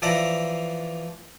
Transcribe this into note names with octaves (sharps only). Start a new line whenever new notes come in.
E3 F3 D5 E5 F#5 A#5